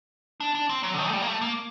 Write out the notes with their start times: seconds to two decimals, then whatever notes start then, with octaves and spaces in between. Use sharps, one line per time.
0.40 D4
0.55 D4
0.69 C4
0.83 F#3
0.94 D3
0.98 D#3
1.09 A3
1.13 G3
1.22 A#3
1.27 A3
1.41 A#3